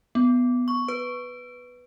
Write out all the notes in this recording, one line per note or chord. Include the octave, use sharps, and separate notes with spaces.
B3
C#6
B4